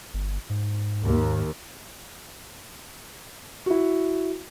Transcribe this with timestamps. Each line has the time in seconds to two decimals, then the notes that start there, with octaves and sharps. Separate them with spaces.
0.14 G1
0.50 G#2
1.04 D#2
3.66 E4 F#4